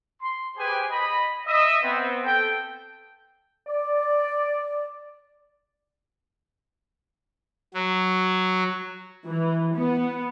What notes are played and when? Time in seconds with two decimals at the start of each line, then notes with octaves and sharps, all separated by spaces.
0.21 C6
0.57 G4 G#4 B4 C5 G5 G#5
0.90 D#5 B5
1.47 D#5 E5
1.82 B3 C4
2.25 A4 G5
3.66 D5
7.74 F#3
9.26 E3
9.76 B3